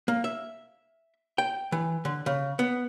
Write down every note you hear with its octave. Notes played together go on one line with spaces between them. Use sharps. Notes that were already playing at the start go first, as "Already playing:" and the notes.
A#3
E5
G5
E3
D3
C#3
B3